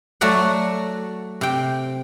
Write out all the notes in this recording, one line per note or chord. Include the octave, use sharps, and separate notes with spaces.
F#3 A3 F#4 D5 F#5
C3 G5